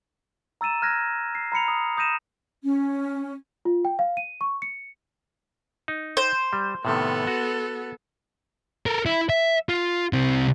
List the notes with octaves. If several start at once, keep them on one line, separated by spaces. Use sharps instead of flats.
A#5 E6 A6 D#7 E7
F6 F#6 G#6 A#6
C7
A#5 B5 C#7 F7
D#6
D#6 G6 A#6 D#7 E7
C#4
F4
G5
F5
D#7
C#6
C#7
D#4
C5
G3
A2 C3 D#3 B3 A4
F#4
A4 A#4
E4
E5
F4
C2 C4